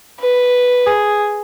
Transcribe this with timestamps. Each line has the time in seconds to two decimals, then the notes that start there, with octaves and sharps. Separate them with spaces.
0.20 B4
0.87 G#4